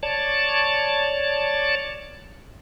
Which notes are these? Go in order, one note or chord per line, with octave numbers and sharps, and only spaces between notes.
C#5 D5 A5